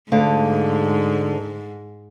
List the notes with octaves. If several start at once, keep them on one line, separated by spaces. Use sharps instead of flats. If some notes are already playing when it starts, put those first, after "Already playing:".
D2 G#2 D3 F5